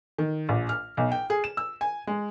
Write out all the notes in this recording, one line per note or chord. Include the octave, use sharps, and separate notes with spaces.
D#3
A#1
F6
B1
G5
G#4
E7
E6
G#5
G#3